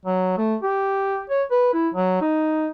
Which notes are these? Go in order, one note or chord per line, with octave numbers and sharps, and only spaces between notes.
F#3
A3
G4
C#5
B4
E4
F#3
D#4